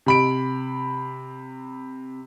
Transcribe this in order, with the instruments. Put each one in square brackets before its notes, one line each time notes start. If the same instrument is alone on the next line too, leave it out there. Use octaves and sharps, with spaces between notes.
[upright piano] C3 B5 D7